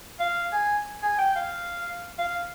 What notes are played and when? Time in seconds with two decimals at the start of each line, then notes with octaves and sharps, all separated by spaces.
0.20 F5
0.53 G#5
1.03 G#5
1.18 G5
1.36 F5
2.18 F5